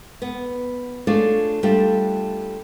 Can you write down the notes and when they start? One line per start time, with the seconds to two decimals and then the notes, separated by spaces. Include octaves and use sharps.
0.22 B3
1.07 A3 D4 F4 G#4 C#5
1.63 G3 A3 D4 F4 G4